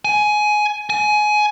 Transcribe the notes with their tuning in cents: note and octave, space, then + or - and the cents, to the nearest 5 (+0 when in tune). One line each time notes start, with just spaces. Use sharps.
G#5 +15
G#5 +20